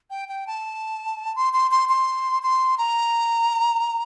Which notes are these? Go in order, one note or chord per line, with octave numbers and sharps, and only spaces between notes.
G5
G5
A5
C6
C6
C6
C6
C6
A#5